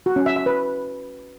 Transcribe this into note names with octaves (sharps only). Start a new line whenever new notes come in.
F#4
C#4
E5
E5
B4